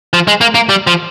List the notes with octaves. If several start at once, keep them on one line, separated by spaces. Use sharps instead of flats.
F3
G#3
A#3
A#3
G3
F3